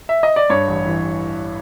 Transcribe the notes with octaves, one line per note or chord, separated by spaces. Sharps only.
E5
D#5
D5
G2 C#5
A1
E3